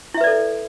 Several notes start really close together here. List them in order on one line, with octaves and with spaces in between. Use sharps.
E4 E5 B4 D5 A4